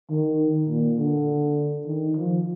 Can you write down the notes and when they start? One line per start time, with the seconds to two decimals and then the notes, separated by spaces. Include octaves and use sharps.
0.10 D#3
0.69 A#2
0.98 D3
1.87 D#3
2.17 F3